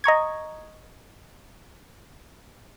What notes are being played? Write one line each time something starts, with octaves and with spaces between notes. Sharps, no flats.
D#5 A#5 C#6 G#6